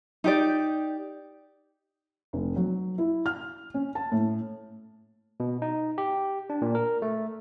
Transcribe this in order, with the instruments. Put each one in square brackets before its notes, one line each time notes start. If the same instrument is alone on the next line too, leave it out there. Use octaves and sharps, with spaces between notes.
[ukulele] D#4 G4 D5
[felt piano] F1
F#3
E4
F6
C#4
A5
A2
[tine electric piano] B2
D#4
G4
D4
A#2
A#4
A3